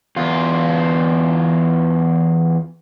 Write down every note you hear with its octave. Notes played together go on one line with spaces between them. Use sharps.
E2 F4